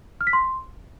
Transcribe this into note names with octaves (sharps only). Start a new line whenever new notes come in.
F6
B6
C6